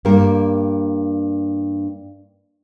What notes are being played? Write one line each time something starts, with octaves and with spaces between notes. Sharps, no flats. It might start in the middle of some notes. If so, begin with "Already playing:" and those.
G2 A#3 A#4